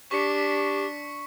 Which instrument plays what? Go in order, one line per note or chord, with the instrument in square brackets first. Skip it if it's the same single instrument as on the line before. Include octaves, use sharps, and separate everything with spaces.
[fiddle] D4 [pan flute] G4 [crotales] C#6 B6 C#7